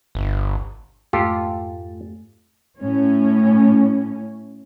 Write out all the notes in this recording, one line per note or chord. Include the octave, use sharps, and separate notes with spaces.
G1
F2 G#2 A3 F4 G4 A4
A2 C#4